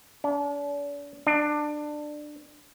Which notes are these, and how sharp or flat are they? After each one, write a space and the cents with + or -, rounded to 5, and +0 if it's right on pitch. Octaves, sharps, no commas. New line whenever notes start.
D4 -40
D4 +20